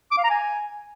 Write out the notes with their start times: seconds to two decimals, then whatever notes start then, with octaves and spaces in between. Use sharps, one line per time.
0.11 D6
0.18 F5
0.24 A#5
0.30 G#5